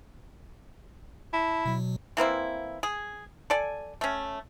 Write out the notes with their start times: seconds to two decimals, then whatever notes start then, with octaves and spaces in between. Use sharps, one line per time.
1.33 E4 A5
1.65 B2 F#3
2.17 E3 A#3 C4 E4
2.83 G#4
3.50 A4 D5 G#5
4.01 A3 C#4